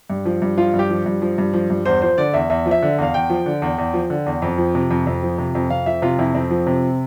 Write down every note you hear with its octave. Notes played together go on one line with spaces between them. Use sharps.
G2
F3
G2
F3 F4
G2
G4
F3
G2
F3
G2
F3
G2
E2 C5
F3 C5
D3 D5
E2 E5
E2 E5
F3
E5
D3
E2 F5
E2 G5
F3
D3
E2
E2
F3
D3
E2
F2
F3
C3
F2
F2
F3
C3
F2
F2 F5
F3 E5
C3 F4
F2 E4
F2 C4
F3
C3